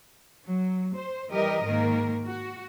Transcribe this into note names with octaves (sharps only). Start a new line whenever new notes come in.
F#3
C5
E3 G3 G4 A#4 D#5
G#2 D#3 A#3 A#4
F#4